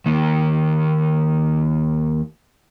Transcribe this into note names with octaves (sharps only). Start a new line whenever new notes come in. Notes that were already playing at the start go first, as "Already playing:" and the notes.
D#2 D#3